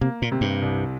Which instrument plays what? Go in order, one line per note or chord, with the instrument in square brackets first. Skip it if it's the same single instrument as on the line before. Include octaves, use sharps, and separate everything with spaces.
[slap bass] C3 [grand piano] A#3
[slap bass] A#2
[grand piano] C3
[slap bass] G2
[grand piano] C2